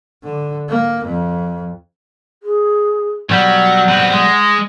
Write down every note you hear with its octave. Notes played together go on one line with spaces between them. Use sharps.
D3
A#3
F2
G#4
B1 F#3 G3 F#5
C4 B4
G#3